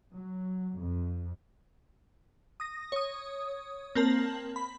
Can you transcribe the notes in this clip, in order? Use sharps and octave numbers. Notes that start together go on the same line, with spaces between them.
F#3
F2
D#6 A#6
C#5 D#6
A#3 C4 A#4 A5 F#7
B5